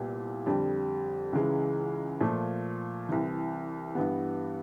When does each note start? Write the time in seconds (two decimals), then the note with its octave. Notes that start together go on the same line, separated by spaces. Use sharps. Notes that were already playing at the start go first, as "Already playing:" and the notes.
Already playing: C2 A#2 G3 B3
0.46 F2 D3 G3
1.33 C#2 C#3 E3 G#3
2.21 A#2 F3 A3
3.09 C2 C3 E3
3.95 G2 E3 G3 B3